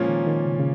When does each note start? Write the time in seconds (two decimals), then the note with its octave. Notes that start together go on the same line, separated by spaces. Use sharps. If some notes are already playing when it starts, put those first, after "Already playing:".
Already playing: A#2 F3 G#3 A#3 C#4
0.08 D#3
0.27 D#3
0.45 C#3
0.52 A#2
0.59 C#3